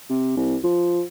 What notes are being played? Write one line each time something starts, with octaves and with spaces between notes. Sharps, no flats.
C3
C2
F3